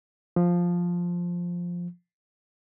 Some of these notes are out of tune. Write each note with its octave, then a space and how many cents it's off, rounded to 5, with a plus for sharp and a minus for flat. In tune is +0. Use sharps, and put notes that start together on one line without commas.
F3 +5